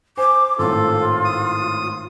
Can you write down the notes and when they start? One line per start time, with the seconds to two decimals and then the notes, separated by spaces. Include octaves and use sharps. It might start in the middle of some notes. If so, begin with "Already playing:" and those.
0.17 C5 G#5 D6
0.58 G#1 A2 F4 A4
1.25 D#6